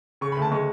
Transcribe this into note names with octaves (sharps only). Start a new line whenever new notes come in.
C#3 C#6
B5
D2
A5
G#3 C#6